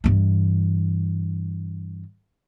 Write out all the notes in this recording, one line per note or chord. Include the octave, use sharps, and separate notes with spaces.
G2 E3